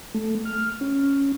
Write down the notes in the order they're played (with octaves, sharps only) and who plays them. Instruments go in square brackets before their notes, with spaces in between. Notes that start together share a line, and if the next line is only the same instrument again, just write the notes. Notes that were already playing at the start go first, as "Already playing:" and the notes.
[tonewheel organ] A3
F6
C#4